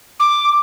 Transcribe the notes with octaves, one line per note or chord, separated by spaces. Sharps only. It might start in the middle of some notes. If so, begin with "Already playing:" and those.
D6